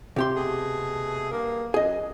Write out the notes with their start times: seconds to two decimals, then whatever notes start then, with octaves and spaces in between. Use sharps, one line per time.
0.16 C3 G4 C6
0.34 B2 A3 G#4
1.31 G2 A#3
1.74 F#2 G#4 D#5